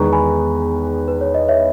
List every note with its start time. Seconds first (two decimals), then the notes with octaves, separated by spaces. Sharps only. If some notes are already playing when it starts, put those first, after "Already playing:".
Already playing: E2 D#3 G#3 B3 D#4 A#5 C#6
0.12 G#5 B5
1.08 B4
1.21 C#5
1.34 D#5
1.48 C#5 E5